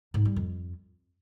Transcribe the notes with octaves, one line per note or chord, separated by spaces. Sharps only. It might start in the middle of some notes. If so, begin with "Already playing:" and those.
G#2
G3
F2